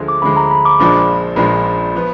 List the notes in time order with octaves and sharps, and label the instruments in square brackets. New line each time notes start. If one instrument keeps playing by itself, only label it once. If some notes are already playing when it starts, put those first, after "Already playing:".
Already playing: [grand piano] D2 D3 F3 G#3
[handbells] D6
[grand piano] D2 D3 F3 G#3 [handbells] B5
[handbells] A#5
B5
D6
[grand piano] A#1 A#2 F3 G#3 D4 [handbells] B5
[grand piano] A#1 A#2 F3 G#3 D4 [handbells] B5
[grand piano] F3 B3